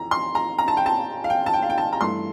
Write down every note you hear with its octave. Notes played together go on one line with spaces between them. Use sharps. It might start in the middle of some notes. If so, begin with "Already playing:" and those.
Already playing: F2 E3 A#5
C6
A#5
A#5
A5
G5
A5
F5
G5
A5
G5
F5
G5
A5
A#5
G2 E3 A3 C6